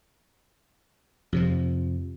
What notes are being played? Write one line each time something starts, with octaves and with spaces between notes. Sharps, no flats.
F2 C3 F3